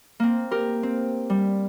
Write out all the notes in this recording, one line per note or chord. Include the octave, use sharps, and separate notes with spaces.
A#3 C4
G4 A#4
C4
G3